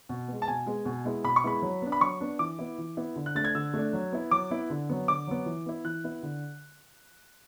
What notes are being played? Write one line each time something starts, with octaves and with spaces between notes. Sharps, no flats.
B2
G#3 B3
A5
B2 G#5
G#3 B3
B2
G#3 B3 E4
B2 B5
C#6
G#3 B3 E4 B5
F#3
B3 D4
B5
F#3 C#6
B3 D4
E3 D6
B3 E4
E3
B3 E4
D3
F#6
A3 D4 A6
G#6
D3 E6
A3 D4
F#3
B3 E4
F#3 D6
B3 E4
D3
F#3 B3
D3 D6
F#3 B3
E3
B3 E4
E3 F#6
B3 E4
D3